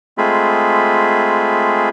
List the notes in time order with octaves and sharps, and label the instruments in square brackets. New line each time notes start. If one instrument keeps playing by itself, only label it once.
[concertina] G#3 A3 C4 F4 G#4 B5